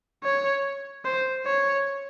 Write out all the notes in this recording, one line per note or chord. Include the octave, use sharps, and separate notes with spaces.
C#5
C5
C#5